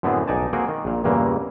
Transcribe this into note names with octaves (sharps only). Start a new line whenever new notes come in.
F#2 A2 D3 B3 C4 G#4
B1 D#4 D5 G#5 A5
A#3 C4 F#4 G#4 G5
D#3
A#1 A#2
E2 G2 A#2 C#3 E3 A#3